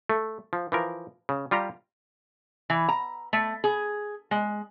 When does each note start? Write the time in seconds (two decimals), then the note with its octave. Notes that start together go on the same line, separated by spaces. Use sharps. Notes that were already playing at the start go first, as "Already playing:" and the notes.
0.09 A3
0.53 F3
0.72 E3 F3 A#4
1.29 C#3
1.51 G3 F4 G4 A#5
2.70 E3
2.88 A#5
3.33 A3
3.64 G#4
4.31 G#3